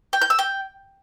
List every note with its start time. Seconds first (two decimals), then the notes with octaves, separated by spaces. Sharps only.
0.13 G5
0.22 G6
0.30 E6
0.39 G5